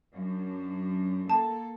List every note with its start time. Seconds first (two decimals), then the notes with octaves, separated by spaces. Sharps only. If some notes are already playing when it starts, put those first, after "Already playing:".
0.15 F#2 D4
1.30 A#3 A4 A5